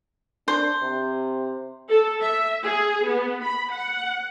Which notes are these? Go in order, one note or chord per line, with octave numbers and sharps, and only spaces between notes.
D4 C5
C3
A4
E5
G#4
B3
B5
F#5